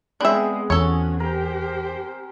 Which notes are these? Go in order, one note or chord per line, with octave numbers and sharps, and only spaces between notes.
G#3 B3 C4 D4 G#4 E5
E2 C#4 F#4 A4 C#5
G4 A#4 C5